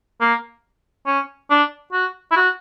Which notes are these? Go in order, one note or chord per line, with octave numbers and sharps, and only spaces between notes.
A#3
C#4
D4
F#4
E4
F#4